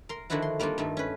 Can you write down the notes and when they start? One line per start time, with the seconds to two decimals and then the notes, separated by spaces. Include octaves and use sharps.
0.09 A#4 C6
0.30 D3 D#3 F3 D4 E4 F#4
0.42 C6
0.59 G3 A#3 D4 D#4 F4
0.78 G2 D#3 A3
0.97 C#4 B4